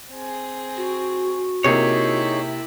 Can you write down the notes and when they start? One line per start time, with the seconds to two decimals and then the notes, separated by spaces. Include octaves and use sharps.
0.11 C4 G#4
0.77 F#4
1.64 C3 A#3 D#4 E4 G#4 C#5